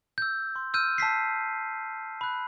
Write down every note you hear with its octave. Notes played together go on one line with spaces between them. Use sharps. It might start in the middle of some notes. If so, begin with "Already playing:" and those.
E6 G6
C6
E6 F6 G6 D#7
A5 E6 B6 C7
B5 F#6